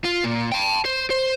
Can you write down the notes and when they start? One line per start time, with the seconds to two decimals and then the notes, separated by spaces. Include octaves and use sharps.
0.05 F4
0.24 A#2
0.52 G5 A5
0.85 C5
1.11 C5